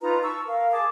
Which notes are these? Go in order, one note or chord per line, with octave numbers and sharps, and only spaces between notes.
D#4 F4 B4 A#5
A5 C#6 E6
A#4 F5
G#4 A5 D6